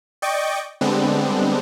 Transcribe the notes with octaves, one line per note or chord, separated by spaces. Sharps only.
D5 D#5 G5 C#6 D6
D3 G3 G#3 B3 C4 D4